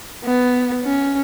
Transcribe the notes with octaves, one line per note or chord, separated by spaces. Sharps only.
B3
C#4